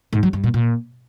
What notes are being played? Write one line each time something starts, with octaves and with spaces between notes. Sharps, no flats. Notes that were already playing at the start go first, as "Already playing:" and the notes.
G#2
F#3
G2
A#2
A#2